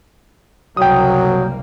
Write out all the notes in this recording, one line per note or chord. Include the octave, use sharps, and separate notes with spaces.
F#1 C2 F#3 A#3 G5 D#6